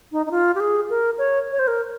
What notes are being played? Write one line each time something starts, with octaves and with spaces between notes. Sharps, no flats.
D#4
D#4
F4
G4
G#4
A#4
C#5
C#5
C5
A#4